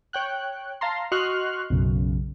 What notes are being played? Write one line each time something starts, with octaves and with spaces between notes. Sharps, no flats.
C#5 G5 F#6
F5 A5 A#5 C6
F#4 D#5 C6 C#6 F6 F#6
B1 F#2 C#3